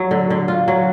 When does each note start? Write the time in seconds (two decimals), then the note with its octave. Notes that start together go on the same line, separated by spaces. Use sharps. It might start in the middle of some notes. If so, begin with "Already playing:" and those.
Already playing: F#3
0.11 D3
0.30 D3
0.48 F4
0.68 F#3